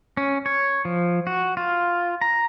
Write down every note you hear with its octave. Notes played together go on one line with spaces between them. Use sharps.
C#4
C#5
F3
F#4
F4
A#5